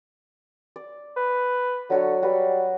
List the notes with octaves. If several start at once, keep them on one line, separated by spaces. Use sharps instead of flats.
D5
B4
D3 F#3 F#4 C#5
G3 F#4 B4 E5